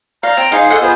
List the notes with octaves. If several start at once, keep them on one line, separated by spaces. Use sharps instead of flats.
D5 F5 A#5 F6 G6
C4 G5
D#4 G#4 C5 F5
A4 D#5 F#5
B3 F4 G#4 C5